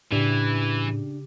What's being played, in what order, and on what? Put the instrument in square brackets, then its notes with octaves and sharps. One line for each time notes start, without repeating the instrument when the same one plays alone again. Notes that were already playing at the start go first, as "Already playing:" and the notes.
[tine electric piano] A2 [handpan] C#3 G4 [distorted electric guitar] E3 [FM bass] D4